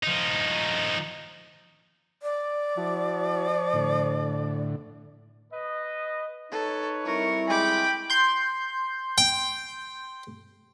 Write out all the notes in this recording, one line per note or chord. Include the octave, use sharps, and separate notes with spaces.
F3 D#4
D5
F3 E4 F#4
A2 D3
B4 D#5
D#4 A4 B4 C#5
G3 C4 E4 A#4 C#6
G#3 G5 B5 D6
C6 G6
G5